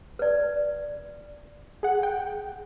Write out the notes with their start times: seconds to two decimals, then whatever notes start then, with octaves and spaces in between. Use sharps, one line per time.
0.19 B4 D5
1.83 G#4 F#5
2.03 G5